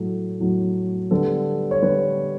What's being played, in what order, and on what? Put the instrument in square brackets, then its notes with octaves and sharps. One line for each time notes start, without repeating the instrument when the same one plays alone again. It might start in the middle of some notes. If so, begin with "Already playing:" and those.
Already playing: [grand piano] A2 F#3 A3 A4
A2 F#3 A3
D3 G3 B3 A4
C#5
D3 G3 B3 B4